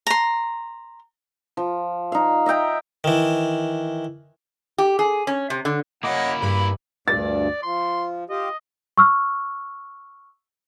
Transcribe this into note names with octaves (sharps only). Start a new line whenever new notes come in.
A#5 C6
F3
D#4 F5
D#5 E5 G5 A#5
D#3 E3
G4
G#4
C#4
C3
D3
A#3 C#4 E4 D#5 F#5 D6
G2 B5
D2 G2 D5 A6
F3 C6
F4 G4 D#5
C#6 E6 F6